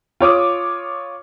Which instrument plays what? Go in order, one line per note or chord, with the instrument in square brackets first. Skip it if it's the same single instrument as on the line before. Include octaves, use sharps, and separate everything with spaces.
[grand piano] F4 C#5 D6 D#6